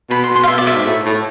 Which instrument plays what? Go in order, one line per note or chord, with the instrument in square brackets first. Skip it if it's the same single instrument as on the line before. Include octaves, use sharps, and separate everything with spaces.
[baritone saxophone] B2 [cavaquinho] B5
[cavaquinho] C6
[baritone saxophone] B2
[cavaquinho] C6
F5
[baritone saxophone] B2 [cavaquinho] E5
[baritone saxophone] B2 [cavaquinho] D5
[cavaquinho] E5
[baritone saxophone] G#2
A2
A2